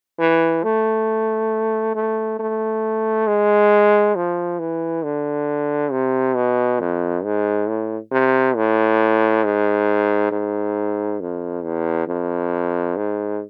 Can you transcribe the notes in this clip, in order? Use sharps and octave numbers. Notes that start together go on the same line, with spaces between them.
E3
A3
A3
A3
G#3
F3
E3
D3
C3
B2
F2
G#2
A2
C3
A2
G#2
G#2
F2
E2
F2
G#2